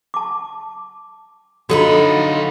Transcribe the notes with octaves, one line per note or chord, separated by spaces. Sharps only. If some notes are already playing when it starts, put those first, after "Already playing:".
A5 D6
D3 F#3 D#4 F4 F#4 A4 B5